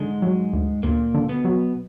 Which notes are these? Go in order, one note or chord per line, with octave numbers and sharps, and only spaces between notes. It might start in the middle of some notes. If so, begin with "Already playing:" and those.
Already playing: G#2 D3 G#3
F#3
D2
D2 A#2 A#3
D3
B2 B3
F#3